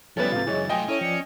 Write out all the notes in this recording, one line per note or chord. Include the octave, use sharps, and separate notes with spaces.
F3 G3 B3 C#4 E4 A4 B4 A6
C2 G#2 C3 F4
C#2 F#2 E3 G#4 C#5 D#5
F#3 A3 F4 D#5 G5 G#5
C#4 E4 A4 C#5 D#7
F3 D5 C#7